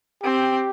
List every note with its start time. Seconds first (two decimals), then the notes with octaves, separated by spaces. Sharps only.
0.23 C4 G4